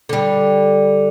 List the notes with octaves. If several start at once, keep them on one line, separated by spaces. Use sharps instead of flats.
D3 G3